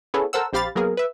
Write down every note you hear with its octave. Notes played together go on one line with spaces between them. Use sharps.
B3 C#4 E4 G#4 A4
A4 A#4 C5 F#5 E6
A#1 C4 G4 F5 B5 A6
F#3 A#3 B3 G#4 A#4
B4 E5